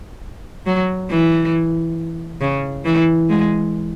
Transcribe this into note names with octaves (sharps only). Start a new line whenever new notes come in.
F#3
E3
C#3
E3
G#3